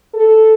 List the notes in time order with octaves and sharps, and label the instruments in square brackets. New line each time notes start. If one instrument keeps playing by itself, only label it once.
[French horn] A4